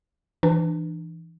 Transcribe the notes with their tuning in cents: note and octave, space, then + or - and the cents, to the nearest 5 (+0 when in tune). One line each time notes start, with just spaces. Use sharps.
E3 +0 D4 +35